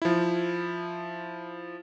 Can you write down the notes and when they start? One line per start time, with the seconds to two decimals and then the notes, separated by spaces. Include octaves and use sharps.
0.02 F3 E4